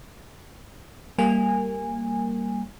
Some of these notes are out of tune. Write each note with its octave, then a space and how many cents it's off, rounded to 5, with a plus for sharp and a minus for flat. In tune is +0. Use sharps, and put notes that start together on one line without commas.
G3 +0 A#3 -10 G#5 -20